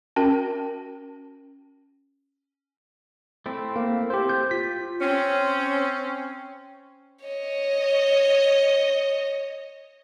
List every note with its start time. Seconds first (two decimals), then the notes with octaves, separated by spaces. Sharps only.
0.16 C#4 F#4 A#4 G5
3.46 A3 C4 E4
3.76 A#3
4.10 G4 C5
4.29 G6
4.51 F4 B6
5.01 C4 C#4
7.25 C#5 D#5